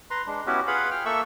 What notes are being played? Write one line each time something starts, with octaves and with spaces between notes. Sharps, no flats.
B4 A#5 C6
G#3 D4
B3 C#4 E4 F#4 G4 B4
F4 G#4 B4 F5 F#5 B5
G5 F6
A#3 A4 E5 C#6 E6